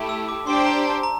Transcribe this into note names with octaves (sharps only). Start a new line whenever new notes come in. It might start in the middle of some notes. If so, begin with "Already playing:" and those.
Already playing: A3 E4 G4
E6
D6
D4 G4 C5 G5 C6
A#5
A5
A#5